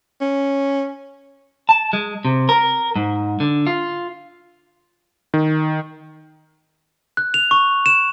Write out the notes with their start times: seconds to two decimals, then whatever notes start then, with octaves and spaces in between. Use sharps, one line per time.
0.21 C#4
1.69 A5
1.93 G#3
2.25 C3
2.49 A#4
2.96 G#2
3.40 D3
3.67 F4
5.34 D#3
7.17 F#6
7.34 F7
7.51 C#6
7.86 E7